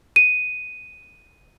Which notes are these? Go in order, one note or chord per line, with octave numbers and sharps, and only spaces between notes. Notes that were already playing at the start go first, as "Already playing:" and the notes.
D#7